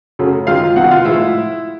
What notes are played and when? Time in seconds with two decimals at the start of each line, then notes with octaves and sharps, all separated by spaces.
0.19 F#2 C#3 F#3 A3
0.47 F#2 D#3 G#3 F4 F5
0.76 C2 C3 D#3 F#4 F#5
0.91 F4 F5
1.05 A2 F3 G#3 E4 E5